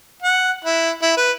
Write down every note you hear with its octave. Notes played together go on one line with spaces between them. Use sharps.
F#5
E4
E4
B4